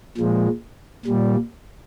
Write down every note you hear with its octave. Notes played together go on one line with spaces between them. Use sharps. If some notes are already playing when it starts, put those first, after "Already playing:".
A#2 F3 G#3
A#2 G3